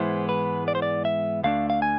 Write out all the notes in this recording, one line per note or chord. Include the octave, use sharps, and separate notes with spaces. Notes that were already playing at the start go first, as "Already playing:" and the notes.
Already playing: G#2 E3 G#3 B3 E4 C5
B4
D5
C5
D5
E5
D2 D3 A3 D4 F5
F5
G#5